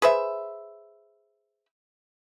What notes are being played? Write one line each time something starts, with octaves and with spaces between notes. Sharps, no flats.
G#4 B4 C5 E5